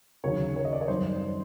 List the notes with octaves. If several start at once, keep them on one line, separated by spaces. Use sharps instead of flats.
D#2 C#3 F#3 C#5
C#5
D#5
D5
C#5
F#2 D#3 G3 C5